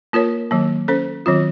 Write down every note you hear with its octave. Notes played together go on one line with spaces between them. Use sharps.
A#3 F4 A#4 C#5
D#3 F#3 A#3
C#4 A4 C5
D#3 F#3 C4 F4